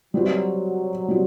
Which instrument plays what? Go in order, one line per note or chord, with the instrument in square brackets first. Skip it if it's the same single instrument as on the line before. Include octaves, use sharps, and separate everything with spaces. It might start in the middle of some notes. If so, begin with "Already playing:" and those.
[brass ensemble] F#3 [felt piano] G3 C4 F#4 B4
[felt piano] G3 C4 F#4